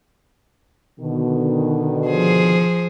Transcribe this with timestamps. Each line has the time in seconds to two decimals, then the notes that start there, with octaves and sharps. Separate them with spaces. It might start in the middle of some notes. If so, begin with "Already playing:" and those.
1.00 B2 D3 D#3
2.07 F3 G#4 C5